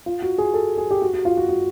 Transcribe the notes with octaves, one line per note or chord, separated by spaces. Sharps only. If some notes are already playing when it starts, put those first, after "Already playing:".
F4
F#4
G#4
A4
G#4
G4
F#4
F#4
F4
F#4
F#4